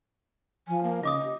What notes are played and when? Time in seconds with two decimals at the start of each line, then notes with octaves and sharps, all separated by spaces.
0.68 F3 G#5
0.83 A#3
1.03 C#3 F4 D#5 D6 D#6
1.23 G4